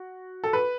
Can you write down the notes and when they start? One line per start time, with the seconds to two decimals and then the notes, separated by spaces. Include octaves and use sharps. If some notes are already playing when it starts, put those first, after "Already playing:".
Already playing: F#4
0.44 A4
0.53 B4